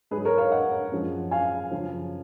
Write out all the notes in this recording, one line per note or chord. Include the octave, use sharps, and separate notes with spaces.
G#2 F#3 G#4 B4
A#4 C#5
C#5 F5
D#5 F#5
F#2 F3 G#3
F5 G#5
F#2 C#3 F3